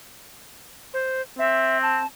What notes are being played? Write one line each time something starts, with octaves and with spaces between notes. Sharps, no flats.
C5
C4 E5
A5